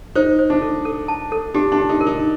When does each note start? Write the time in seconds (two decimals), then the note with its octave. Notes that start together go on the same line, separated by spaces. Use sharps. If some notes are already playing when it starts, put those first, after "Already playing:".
0.15 D#4 C5
0.39 C5
0.50 D4
0.62 A4
0.85 A4
1.08 A5
1.32 A4
1.54 D4 G4
1.72 D4
1.78 G4
1.89 D#4
2.01 A#4
2.06 D#4